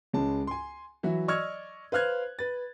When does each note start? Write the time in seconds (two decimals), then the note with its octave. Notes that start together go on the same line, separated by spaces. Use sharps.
0.13 C#2 G#3 C#4 A5
0.47 G#5 C6
1.03 E3 F#3 F#4 E5
1.28 D5 D#5 C#6 E6 F6 G#6
1.92 B4 C5 F5 F6 F#6 G#6
2.39 B4 A6